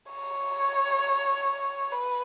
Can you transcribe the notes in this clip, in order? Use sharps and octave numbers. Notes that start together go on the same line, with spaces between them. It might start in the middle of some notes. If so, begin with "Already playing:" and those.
C#5
B4